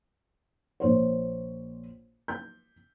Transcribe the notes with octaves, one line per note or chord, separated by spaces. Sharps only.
A#1 C5 C#5
G6